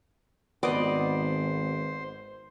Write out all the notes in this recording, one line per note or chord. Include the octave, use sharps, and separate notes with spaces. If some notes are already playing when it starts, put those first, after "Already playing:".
G#1 B3 C5 D5 D#5